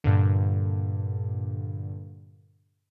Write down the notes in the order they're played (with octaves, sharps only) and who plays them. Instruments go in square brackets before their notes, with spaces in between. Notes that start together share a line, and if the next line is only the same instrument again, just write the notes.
[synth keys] G2 A#2 D3